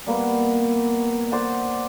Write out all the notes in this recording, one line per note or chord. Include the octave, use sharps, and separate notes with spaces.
G3 A#3 B3
C5 D5 F#5